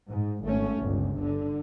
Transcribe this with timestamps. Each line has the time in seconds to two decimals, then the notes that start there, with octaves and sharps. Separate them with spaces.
0.10 G#2
0.45 G#1 A3 C#4
0.81 G1 C#2
1.21 D3